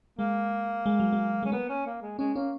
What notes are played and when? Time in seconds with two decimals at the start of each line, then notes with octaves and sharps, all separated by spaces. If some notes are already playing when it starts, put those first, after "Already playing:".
0.19 G#3 A#3
0.86 G#3
1.00 F#3
1.13 G#3
1.43 G#3 C#4
1.52 A#3 B3
1.69 C#4
1.86 A#3
2.02 G#3
2.18 G#3 C#4
2.35 A#3 C#4